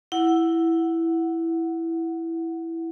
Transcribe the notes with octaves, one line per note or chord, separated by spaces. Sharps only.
E4 F#5